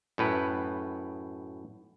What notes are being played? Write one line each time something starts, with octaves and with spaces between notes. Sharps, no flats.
F#2 A2 B4